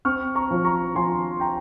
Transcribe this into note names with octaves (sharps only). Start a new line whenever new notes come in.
C4 C#6 F6
A#5 C#6
F3
A#5 C#6
F3 G#5 C6
G5 A#5